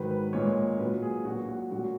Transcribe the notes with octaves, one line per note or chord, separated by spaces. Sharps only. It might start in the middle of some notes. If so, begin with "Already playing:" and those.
Already playing: G#2 D#3 F#3 B4
B4
A#2 G#3 C#5
A#2 F#3 B4
G#4
A#2 F#3 F#4
F#4
A#2 F#3 F#4